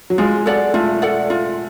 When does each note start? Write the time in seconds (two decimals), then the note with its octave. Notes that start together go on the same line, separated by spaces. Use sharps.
0.10 F#3
0.18 G#3 F4
0.46 A4 D5 F#5
0.74 A3 F4
1.02 A4 D5 F#5
1.30 F4